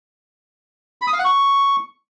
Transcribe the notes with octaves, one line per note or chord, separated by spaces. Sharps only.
B5
D#6
F5
F#5
C#6